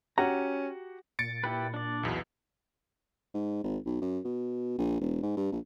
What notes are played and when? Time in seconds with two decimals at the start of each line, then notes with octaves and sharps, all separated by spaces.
0.18 C#4 F#4 G4 F#5 A#5
1.19 A#2 A6 C#7 D7
1.44 E4 G4 B4
1.74 D4 D5
2.03 B1 E2 B2
3.34 G#2
3.64 G#1
3.86 B1
4.01 F#2
4.25 B2
4.78 A#1
5.01 E1
5.23 G#2
5.37 G2
5.52 A#1